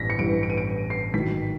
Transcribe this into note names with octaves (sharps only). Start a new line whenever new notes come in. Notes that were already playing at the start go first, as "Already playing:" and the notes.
Already playing: A1 G2 E3 A#6 B6
C#7
A1 G2 E3 D7
D7
D#7
D7
C7
A1 G#2 D#3 F#3 B6